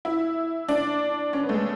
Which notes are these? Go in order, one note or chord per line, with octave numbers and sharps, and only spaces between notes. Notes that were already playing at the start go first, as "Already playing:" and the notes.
E4
D4
C#4
B3
A3
G#3